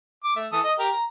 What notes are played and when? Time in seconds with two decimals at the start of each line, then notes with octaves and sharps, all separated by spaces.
0.24 D6
0.36 A3 E5
0.52 E3 A4 D#6
0.64 D#5
0.79 G4 A#4
0.91 A#5